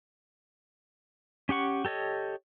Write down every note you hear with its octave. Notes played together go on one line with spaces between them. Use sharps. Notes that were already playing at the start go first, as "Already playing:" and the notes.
C#4 G4 F#5 C#6
G4 A4 C#5 D#5